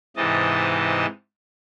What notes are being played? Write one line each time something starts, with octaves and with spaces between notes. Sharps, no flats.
G#2 C3 E3 D#5 A5